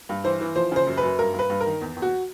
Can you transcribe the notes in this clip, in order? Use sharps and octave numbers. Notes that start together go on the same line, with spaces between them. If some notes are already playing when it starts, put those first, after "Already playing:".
G2
E3 C5
E3
F3 C5
C#3 C5
F#2
B4
F#2
G2 A#4
G2
B4
G2
A#4
D#3
E2
E2
F#4